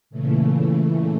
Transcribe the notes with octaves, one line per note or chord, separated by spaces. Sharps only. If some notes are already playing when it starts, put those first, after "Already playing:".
A#2 C#3 E3 A3